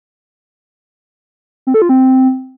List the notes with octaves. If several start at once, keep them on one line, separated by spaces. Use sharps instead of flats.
C4
A4
F4
C4